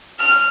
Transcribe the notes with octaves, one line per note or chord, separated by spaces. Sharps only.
F6